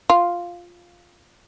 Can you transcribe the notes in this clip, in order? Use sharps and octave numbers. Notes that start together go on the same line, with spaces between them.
F4